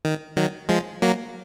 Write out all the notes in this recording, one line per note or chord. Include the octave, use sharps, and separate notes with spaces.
D#3
D#3 F#3
F3 G#3
F#3 A#3